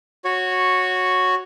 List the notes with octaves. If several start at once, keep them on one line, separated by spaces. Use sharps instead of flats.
F#4 C#5